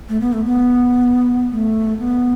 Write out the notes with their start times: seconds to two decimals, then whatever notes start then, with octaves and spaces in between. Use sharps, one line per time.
0.09 A3
0.21 B3
0.33 A3
0.45 B3
1.51 A3
1.99 B3